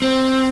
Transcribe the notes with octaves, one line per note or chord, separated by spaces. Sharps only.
C4